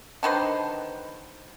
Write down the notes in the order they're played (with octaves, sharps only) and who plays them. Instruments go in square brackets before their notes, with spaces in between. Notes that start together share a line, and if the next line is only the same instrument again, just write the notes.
[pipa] D3 D#3 B4 C5